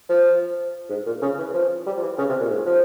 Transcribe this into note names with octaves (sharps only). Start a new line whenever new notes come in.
F3
G#2
A#2
C#3
E3
F3
G3
F3
E3
C#3
C3
A#2
G#2
F3